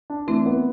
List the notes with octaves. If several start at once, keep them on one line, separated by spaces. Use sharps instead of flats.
D4
E3 A3 C4
B3